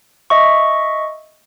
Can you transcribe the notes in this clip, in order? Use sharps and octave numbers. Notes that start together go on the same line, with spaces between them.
D#5 E5 C#6